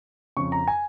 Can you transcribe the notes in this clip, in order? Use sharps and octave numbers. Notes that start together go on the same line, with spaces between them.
F2 C#3 C#6
A#5
G#5